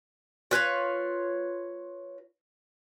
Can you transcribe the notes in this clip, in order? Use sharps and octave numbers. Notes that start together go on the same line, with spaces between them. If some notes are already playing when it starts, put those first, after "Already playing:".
F4 B4 C#5 F5